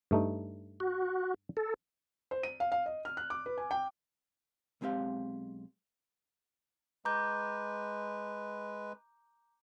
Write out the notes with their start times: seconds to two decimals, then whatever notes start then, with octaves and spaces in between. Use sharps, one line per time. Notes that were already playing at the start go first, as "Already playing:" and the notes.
0.11 G2 A3 D#4
0.80 F#4
1.57 A4
2.31 C5
2.43 D#7
2.60 F5
2.72 F5
2.86 D#5
3.05 F6
3.17 F#6
3.30 D6
3.46 B4
3.58 G#5
3.71 G5
4.81 B1 G#3 C4 G4 F5
7.05 G#3 B4 A#5 D6 G6